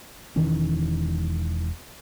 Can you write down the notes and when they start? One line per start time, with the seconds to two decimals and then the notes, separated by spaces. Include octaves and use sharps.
0.36 E1 D#3 E3 C#4